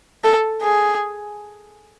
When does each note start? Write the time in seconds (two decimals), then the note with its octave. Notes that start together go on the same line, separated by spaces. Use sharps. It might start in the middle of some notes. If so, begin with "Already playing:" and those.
0.24 A4
0.62 G#4